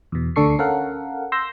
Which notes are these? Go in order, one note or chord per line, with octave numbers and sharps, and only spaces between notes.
E2 B2
D2 D3 D4 A4 C#6 C7
C#4 A4 A#4 F5 F#5
C6 E6 G6 A#6